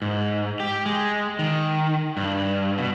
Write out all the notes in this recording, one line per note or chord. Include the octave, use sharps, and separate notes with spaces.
G#2
G4
G#3
D#3
G2
B2